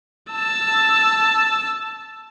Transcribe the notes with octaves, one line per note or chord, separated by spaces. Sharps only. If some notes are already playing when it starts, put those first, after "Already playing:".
A5 E6